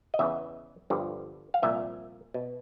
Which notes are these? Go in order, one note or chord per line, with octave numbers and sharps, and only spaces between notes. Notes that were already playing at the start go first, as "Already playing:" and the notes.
D#5
E2 C#3 E3 E5
G1 G2 D3 F3
F5
C2 A#2 F3 E5
B2